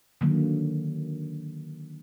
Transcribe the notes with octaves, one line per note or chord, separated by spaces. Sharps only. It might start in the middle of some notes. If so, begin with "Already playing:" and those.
D3 D#3 F#3 A#3